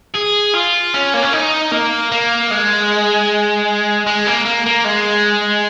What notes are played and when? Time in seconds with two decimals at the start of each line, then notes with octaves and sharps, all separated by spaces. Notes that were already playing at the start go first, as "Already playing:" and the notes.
0.15 G#4
0.55 F4
0.94 C#4
1.14 A#3
1.23 C#4
1.33 D#4
1.72 A#3
2.12 A#3
2.51 G#3
4.06 G#3
4.27 A#3
4.46 A#3
4.66 A#3
4.85 G#3